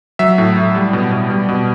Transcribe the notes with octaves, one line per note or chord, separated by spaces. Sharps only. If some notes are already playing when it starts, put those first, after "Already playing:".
F#3 E5
A2
A2
G3
B2
B2
G3
B2